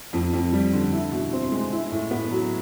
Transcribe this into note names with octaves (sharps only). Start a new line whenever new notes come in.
F2
F2
G3
D3
E4
B2
C4
G#3
E4
A2
B3
F#3